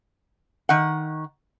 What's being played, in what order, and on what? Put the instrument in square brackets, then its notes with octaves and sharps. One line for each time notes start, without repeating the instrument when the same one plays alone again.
[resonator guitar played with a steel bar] D#3 F#5